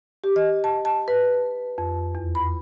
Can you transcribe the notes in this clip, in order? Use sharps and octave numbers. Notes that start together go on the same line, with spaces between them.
G4
D#5
A5
A5
B4
F2
E2
B5